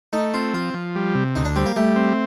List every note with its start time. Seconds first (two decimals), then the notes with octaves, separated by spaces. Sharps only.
0.13 A3 D#4
0.34 C4 F4
0.53 F3 F4
0.74 F3
0.95 G3
1.15 C3
1.35 D2 D#4
1.45 D4
1.56 G3 C4
1.66 A#3
1.76 G3 A3
1.96 C4